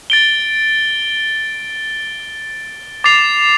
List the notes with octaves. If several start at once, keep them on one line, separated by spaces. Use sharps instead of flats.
A6 D7 G7
D6 A6 C7 F7